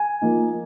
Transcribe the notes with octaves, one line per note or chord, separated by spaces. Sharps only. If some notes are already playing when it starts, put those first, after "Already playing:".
Already playing: G#5
F3 A#3 D#4